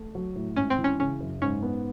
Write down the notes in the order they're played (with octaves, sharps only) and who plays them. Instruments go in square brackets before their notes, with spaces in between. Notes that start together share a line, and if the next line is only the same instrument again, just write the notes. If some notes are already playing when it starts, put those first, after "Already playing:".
Already playing: [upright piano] A3
F#3
A2
[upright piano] G#1 [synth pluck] C#4
[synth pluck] C4
[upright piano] E3
[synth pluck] C#4
[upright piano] C#3 [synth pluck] C#4
[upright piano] F#2
[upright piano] G#2 [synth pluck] C#4
[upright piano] B3